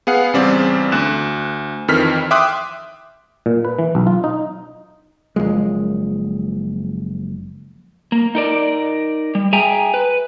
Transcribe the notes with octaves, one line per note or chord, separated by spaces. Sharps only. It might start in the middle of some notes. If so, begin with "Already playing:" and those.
B3 G#4 F5 F#5
E2 C#3 G3 C4 D5
D2 F#6 E7
F2 D#3 E3 F6 B6
E5 G5 C6 D6 D#6 F#6
A#2
B4
E3
B1
F4
D#4
F#1 C#2 F3 G#3
A#3
D#4 A#4 D5
G3
G#4 E5 G5 G#5 A#5
B4